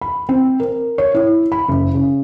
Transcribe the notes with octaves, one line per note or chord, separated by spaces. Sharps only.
B5
C4
A#4
C#5
E4
B5
F#1
C#3